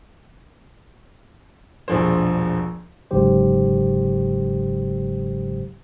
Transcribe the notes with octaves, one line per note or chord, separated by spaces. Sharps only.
E1 A#1 G2 F3 G#4 C5
G1 G#2 C#3 F#3 G4 C5